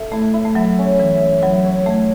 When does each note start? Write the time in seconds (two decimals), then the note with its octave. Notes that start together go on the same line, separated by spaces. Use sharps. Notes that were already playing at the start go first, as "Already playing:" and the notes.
Already playing: A4 E5
0.12 A3 E4
0.33 E4
0.45 A3
0.55 F#3 E5
0.78 C#4
0.99 E3 E5
1.21 E5
1.42 F#3 E4
1.64 C#5
1.86 A3 E4